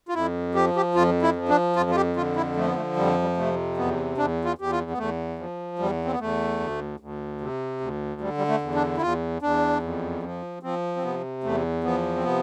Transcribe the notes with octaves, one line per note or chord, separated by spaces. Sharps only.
F4
F2 E4
F3 G4
G4
F2 F4
E4
F3
D4
F2 F4
F4
G4
D3 F4
E4
F3 A3
B3
A3
F2 G3
G3
C3 A3
E2 B3
E2 D4
F4
E2 G4
F4
B3
E2 A3
F3
E2 G3
C4
B3
E2 A3
D2
D2
C3
D2
D3 G3
G3
A3
E2
D4
E4
E2 F4
E2 D4
F2
F3
F3 C4
C4
C3 B3
E2 A3
F3 B3
C4
C3 B3